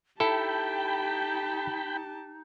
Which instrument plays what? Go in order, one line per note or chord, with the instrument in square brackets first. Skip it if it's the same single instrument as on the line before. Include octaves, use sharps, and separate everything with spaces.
[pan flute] D#4 [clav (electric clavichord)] E4 A4 [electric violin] G4 A5 [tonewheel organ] G5 B5